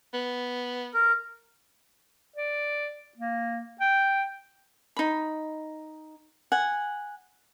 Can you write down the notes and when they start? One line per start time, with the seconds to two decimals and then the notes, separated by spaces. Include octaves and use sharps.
0.14 B3
0.94 A#4
2.36 D5
3.18 A#3
3.81 G5
4.97 D#4 B5
6.52 F#5 G#5